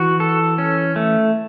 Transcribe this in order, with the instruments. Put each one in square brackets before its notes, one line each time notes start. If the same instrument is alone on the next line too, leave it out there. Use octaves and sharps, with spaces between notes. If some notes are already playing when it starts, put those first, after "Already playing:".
Already playing: [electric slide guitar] E3 [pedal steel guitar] F#4
[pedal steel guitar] A4
C#4
A3